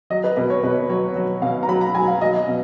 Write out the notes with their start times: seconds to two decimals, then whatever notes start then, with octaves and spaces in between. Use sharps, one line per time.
0.10 F#3 D#5
0.24 B4
0.37 B2 B4
0.50 C#5
0.63 B2 B4
0.89 F#3 C#5
1.16 F#3
1.42 B2 F5
1.63 A#5
1.69 F#3 B5
1.81 A#5
1.95 F#3 G#5
2.08 F5
2.21 F#3 D#5
2.48 B2